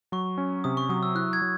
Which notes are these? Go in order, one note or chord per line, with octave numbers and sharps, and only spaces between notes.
F#3 C#6
C#4
C3 D#6
C#6
F#3 D#6
E6
E4 F#6
G#6
F#3